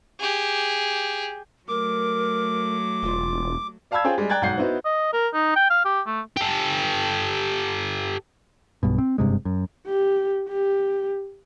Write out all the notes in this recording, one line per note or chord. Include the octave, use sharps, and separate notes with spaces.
G4 G#4
F#3 A3 A#4 D6
E1 F4
D5 F5 A5 B5 E6 G#6
C#4 F4 G#4 C5 G5
G3 G#3
D5 G5 A#5 F#6 G#6 A6
B1 G#2 F#5 G6 C7
B3 D#4 E4 F#4 C5
D#5
A#4
D#4
G5
F5
G4
A3
G4 A4
B1 G2 B2
C4
F#1 G2 C3 G#3
F#2
G4
G4